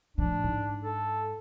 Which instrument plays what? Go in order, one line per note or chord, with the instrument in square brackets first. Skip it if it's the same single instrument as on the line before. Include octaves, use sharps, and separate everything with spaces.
[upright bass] A2 F3 [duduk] D4
[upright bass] G#2
[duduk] A4